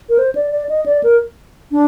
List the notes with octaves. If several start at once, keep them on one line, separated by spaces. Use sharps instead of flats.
A#4
C5
D5
D5
D#5
D5
A#4
D4